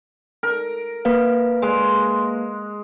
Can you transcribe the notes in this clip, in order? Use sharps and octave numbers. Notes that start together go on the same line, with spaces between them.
A#4
A#3 B4 F5
G#3